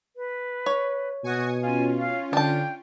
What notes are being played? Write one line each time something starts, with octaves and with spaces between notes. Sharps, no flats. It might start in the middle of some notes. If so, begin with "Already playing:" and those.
B4
C#5
B2 F#4 G#5 C#6 D#6
C#4 F4 G#5
F5
D3 D4 G5 A5